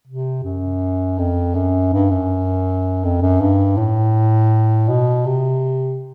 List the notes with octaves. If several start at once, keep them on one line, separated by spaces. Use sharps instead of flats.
C3
F#2
F2
F#2
G2
F#2
F2
F#2
G2
A2
B2
C3